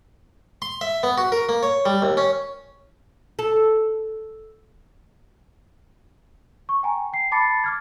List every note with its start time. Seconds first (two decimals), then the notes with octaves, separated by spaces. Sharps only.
0.62 C6
0.81 E5
1.03 B3
1.18 F#4
1.32 A#4
1.49 A#3
1.63 C#5
1.86 G3
2.02 D#2
2.17 C#4
3.39 A4
6.69 C#6
6.83 G5 G#5 A#5
7.13 G5 C7
7.32 A5 B5 D6 A6 C7 C#7
7.64 D6 F6 G#6